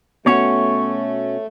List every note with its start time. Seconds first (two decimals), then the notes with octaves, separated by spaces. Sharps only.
0.26 B2 A3 C#4 F#4 C#5